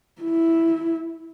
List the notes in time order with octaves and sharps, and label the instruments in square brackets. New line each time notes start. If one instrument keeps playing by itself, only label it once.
[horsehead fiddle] E4